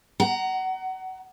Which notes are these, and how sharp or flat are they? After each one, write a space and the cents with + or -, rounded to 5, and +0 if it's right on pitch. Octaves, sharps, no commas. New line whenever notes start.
F#5 +25 A#5 +0